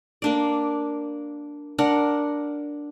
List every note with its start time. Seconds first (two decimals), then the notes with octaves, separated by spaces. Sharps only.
0.22 A#3 D4 D5
1.78 D4 A#4 F#5